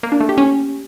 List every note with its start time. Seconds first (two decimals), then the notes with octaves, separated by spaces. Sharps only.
0.03 A#3
0.12 D4
0.20 A3
0.29 G4
0.38 C#4